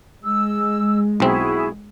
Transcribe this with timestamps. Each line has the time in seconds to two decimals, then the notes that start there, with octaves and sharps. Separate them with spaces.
0.23 G#3 E6
1.20 B1 C4 E4 F#4 G#4